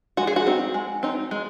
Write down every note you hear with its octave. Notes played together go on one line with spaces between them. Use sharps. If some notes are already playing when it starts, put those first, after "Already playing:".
G#3 F#4
G#4
F#4
C4 D#4
G#3
C4 D#4
G#3